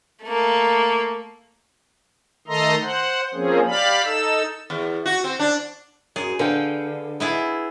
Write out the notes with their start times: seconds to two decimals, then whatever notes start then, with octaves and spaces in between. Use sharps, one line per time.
0.24 A3 A#3
2.47 D#3 A3 A4 D#5 A#5 C6
2.82 C5 F#5
3.34 F3 A#3 C4 C#4 G#4
3.67 G4 D5 F5 B5
4.05 D#4 A4 E6
4.70 E2
5.06 F#4
5.24 C4
5.39 D4
6.16 F#2 G#4
6.39 D3 B4 F5 G5
7.20 B3 E4 G#4